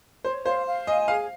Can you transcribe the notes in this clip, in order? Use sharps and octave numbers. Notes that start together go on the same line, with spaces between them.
C5 C#5
C5 F5
F5
D#5 G#5
G#4 F5